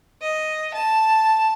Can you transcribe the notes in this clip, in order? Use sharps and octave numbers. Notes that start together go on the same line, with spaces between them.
D#5
A5